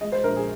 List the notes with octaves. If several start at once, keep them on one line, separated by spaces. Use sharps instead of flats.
G#3 D#5
C5
A#1 A#4
G#4